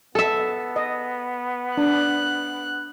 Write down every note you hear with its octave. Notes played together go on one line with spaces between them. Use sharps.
B3 A4 E5
D#5
D4 F#6